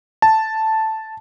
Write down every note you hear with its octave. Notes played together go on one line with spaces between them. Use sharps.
A5